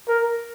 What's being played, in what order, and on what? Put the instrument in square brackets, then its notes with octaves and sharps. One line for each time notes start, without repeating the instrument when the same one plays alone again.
[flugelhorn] A#4